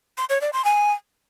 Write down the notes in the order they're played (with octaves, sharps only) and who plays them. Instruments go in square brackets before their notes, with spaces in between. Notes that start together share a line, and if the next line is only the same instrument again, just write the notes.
[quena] C6
C#5
D5
C6
G#5